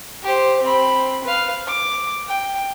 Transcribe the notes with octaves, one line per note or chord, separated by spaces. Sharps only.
G4 C5
C4 B5
B4 F5
D6
G5